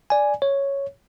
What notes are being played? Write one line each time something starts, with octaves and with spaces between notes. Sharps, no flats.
D5 G#5
C#5